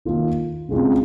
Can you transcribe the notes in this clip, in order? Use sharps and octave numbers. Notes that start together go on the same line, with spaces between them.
D#3 A#3 F4
C#3 G#3 C4 F4